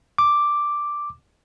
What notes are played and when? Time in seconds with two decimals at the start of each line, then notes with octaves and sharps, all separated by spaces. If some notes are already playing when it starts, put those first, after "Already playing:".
0.18 D6